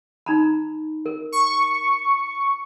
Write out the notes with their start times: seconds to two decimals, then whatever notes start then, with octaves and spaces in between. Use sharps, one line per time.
0.26 D#4 A#5 B5
1.06 A#4
1.32 C#6